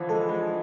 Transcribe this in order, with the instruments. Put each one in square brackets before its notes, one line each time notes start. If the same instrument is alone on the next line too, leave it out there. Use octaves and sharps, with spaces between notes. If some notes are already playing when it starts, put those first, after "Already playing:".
Already playing: [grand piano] D3 E3 F3 [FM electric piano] F4
[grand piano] G#3 [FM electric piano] A4
[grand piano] G#3